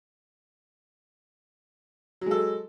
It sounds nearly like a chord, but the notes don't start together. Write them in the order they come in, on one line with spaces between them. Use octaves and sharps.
F#3 G#3 A4